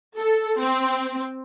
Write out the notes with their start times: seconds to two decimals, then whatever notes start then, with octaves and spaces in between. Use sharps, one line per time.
0.18 A4
0.59 C4